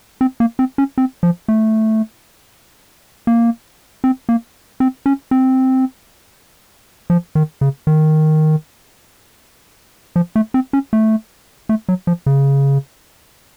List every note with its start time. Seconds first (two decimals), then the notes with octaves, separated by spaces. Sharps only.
0.21 C4
0.40 A#3
0.59 C4
0.78 C#4
0.98 C4
1.23 F3
1.48 A3
3.27 A#3
4.04 C4
4.29 A#3
4.80 C4
5.06 C#4
5.31 C4
7.10 F3
7.35 D#3
7.61 C#3
7.87 D#3
10.16 F3
10.36 A3
10.54 C4
10.73 C#4
10.93 A3
11.69 A3
11.89 F#3
12.07 F3
12.26 C#3